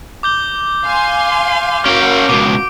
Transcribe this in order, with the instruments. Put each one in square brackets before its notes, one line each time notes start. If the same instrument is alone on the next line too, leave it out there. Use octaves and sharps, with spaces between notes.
[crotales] D6 G6 G7
[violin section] F5 G#5 C6
[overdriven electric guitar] C#4 G5 [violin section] F#4 A#4 F5 [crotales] D7
[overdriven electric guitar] C#2 B2 [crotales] D6